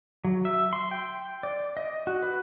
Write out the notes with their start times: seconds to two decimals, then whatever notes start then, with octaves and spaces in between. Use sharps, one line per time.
0.25 F#3
0.45 E5
0.73 C6
0.91 G5
1.43 D5
1.77 D#5
2.07 F#4
2.22 B4